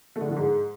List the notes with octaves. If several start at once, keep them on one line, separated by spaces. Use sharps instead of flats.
A3
D3
A2
D3
G#2